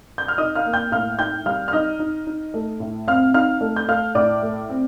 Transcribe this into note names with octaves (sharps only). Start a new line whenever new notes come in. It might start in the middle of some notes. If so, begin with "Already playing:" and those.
G6
F6
D#4 D#5 D#6
F5 F6
A#3
G5 G6
A2 F5 F6
D#4 G5 G6
G3 F5 F6
F6
D#4 D#5 D#6
D#4
D#4
A3
A2
C4 F5 F6
D#4 F5 F6
A3
G6
A3 F5 F6
A2 D5 D6
A3
C4